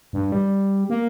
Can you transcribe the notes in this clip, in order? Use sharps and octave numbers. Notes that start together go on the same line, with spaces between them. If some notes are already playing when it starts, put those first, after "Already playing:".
G2
G3
A#3